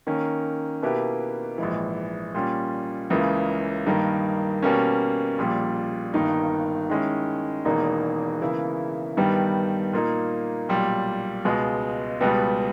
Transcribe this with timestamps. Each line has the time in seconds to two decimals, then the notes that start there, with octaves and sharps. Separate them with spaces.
0.07 D#3 A#3 C#4
0.82 B2 A#3 E4 G4 B4
1.58 A#1 G#2 E3
2.35 A#2 G3 C#4
3.10 C#2 C#3 E3 A#3
3.86 G2 D#3 A#3
4.63 B2 G3 A#3 C#4
5.38 A#1 A#2 G3
6.14 G1 G2 D#3 A#3 D#4
6.89 D#3 G#3 C#4 E4
7.65 E1 E2 D#3 A#3 D#4
8.41 C#3 E3 A#3 E4
9.17 G2 D#3 G3 B3
9.93 A#2 A#3 D#4
10.69 B1 A#2 G3
11.45 C#2 B2 G#3
12.20 C#2 B2 G3 B3